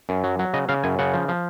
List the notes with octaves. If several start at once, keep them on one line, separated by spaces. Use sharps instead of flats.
F#2
F#3
F#3
C#3 D#5
C#3 F5
F#2 G#5
C#3 F#5
F3
F3